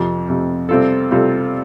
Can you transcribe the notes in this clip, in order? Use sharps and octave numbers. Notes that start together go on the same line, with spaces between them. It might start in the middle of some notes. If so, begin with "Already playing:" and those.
Already playing: F2 C3 F3
F2 C3 F3
C3 G3 C4 F4 A4
C3 G3 C4 F4 A4